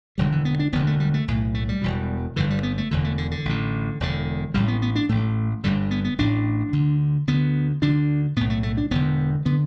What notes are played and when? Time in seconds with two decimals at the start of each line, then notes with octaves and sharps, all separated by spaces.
0.18 E1 D2 D3 G3
0.32 E3
0.45 B3
0.59 D4
0.73 E1 D2 D3 B3
0.87 A3
1.00 G3
1.14 A3
1.28 B1 A2
1.55 A3
1.69 G3
1.81 E1 E2 B2
2.36 G1 G2 D3 E3
2.50 G3
2.63 B3
2.78 A3
2.91 E1 E2 D3
3.04 A3
3.18 D3
3.31 D3
3.45 A1 A2
4.00 E1 E2 D3
4.54 A1 A2 G3
4.68 B3
4.82 B3
4.96 D4
5.09 A1 A2 A3
5.64 G1 G2 D3 G3
5.91 B3
6.04 B3
6.18 A1 A2 D4
6.73 D2 D3
7.28 D2 D3 B3
7.82 D2 D3 D4
8.36 B1 A2 B3
8.50 A3
8.63 A3
8.77 D4
8.91 E1 E2 D3 B3
9.45 D3 B3